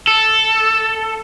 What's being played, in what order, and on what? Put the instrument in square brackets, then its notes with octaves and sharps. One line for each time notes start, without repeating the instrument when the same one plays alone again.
[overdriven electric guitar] A4